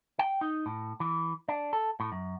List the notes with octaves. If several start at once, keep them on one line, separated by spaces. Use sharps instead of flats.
G5
D#4
A2
E3
D4
A4
A2
F#2